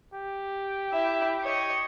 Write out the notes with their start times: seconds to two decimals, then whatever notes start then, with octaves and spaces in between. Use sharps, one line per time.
0.14 G4
0.92 E4 E5
1.42 C#5 D#5